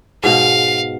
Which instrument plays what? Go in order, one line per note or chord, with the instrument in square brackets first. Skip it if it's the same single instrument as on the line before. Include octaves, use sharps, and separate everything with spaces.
[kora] G#2 B2 [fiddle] F5